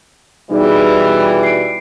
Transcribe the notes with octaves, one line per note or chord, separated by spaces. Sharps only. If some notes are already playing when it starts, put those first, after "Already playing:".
B2 E3 G3 D#4 G#4 D5
C7 D7